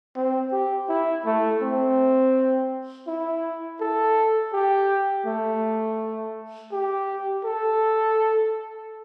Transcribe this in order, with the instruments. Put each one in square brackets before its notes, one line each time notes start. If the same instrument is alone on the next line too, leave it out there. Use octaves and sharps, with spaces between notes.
[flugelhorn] C4
G4
E4
A3
C4
E4
A4
G4
A3
G4
A4